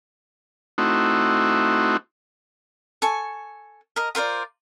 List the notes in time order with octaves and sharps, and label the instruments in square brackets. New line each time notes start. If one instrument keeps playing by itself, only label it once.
[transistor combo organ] A3 C4 D#4 E4 F#4
[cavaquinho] A4 G#5 C#6
A#4 D#5
F4 A#4 C5 D5